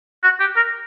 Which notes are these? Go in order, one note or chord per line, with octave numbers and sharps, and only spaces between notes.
F#4
G4
A#4